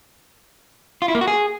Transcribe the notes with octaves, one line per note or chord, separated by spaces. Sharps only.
F4
E4
A#3
F#4
G#4